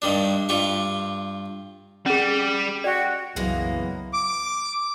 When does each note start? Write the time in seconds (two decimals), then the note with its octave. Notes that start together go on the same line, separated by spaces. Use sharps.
0.02 G2 D#3 G3 D4
0.49 G2 F4 G4 C#6
2.06 G3 C#4 G#4
2.84 F#4 D5 G5
3.36 F#1 C2 E3 F#3 G#3 A#3 B3
4.13 D6